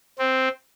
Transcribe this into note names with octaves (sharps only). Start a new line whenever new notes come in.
C4